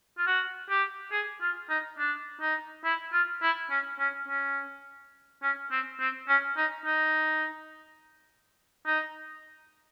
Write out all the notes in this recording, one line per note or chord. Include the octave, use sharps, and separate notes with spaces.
F4
F#4
G4
G#4
F4
D#4
D4
D#4
E4
F4
E4
C#4
C#4
C#4
C#4
C4
C4
C#4
D#4
D#4
D#4